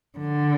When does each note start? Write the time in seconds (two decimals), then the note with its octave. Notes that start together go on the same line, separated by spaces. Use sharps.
0.18 D3